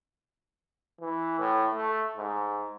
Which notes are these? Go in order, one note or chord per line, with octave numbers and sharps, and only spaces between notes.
E3
A2
A3
G#2